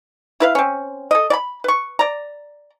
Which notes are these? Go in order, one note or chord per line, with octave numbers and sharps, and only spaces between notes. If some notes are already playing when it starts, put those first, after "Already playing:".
E4 B4 F5
C4 C#4
A4 D#5
D5 B5
B4 C#6
D5 A#5